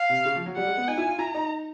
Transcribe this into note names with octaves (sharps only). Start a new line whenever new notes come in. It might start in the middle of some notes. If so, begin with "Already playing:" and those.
Already playing: F5
C3
C#3
F3
F#3
G3 F#5
G#3
B3
D#4 G#5
E4
F4
E4 A#5
D#4